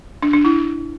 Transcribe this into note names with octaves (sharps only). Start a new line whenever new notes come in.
D4
D4
E4